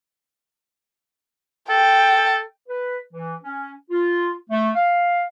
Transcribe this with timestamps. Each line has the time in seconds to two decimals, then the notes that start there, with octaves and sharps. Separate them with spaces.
1.70 A4 G5
2.68 B4
3.13 E3
3.43 C#4
3.91 F4
4.50 A3
4.75 F5